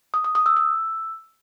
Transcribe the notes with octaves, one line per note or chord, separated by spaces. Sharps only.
D#6
D#6
D#6
E6
E6